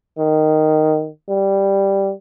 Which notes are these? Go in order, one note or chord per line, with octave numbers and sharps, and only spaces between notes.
D#3
G3